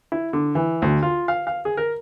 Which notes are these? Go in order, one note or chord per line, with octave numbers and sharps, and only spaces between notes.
E4
D3
E3
D2
F4
F5
F5
G#4
A#4